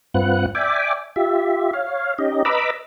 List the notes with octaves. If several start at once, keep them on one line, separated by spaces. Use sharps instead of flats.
G2 C4 F4 B4 F#5 F#6
D5 E5 G5 G#5 D6
F4 G4 E5
C#5 F5
C#4 D#4 G4 D#5
B4 D#5 A#5 B5 D6 E6